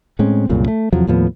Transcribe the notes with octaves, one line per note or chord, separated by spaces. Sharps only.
A2 G#3 C4 C#4
C2 F#2 A#2 C#3
A3
E2 C3 F3 F#3
D#2 A2 F3 B3